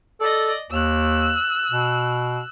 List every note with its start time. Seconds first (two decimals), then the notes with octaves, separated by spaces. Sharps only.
0.21 A4 D5 D#5
0.71 D#2 E6 F#6
1.71 B2